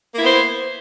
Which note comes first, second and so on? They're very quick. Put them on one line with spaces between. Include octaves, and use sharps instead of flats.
A#3 E4 B3 C5